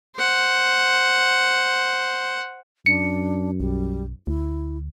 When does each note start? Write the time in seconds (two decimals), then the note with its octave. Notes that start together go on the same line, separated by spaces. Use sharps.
0.16 C5 F#5
2.86 F#2 D4 C#7
3.60 B1 G3
4.27 D2 E4